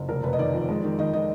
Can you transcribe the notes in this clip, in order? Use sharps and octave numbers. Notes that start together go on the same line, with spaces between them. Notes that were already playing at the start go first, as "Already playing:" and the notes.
Already playing: F#1
F1 A#4
F1 B4
D#5
D#3 D5
F2
G#3
D#3
D#3 D#5
D#3 D#5